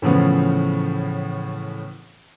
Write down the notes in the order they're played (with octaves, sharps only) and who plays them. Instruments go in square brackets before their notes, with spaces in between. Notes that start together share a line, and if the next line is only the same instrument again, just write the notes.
[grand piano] A2 C#3 E3 F3 B3 C#4